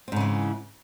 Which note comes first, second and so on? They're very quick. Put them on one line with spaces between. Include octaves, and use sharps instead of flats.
C4 G#2 C#3 E3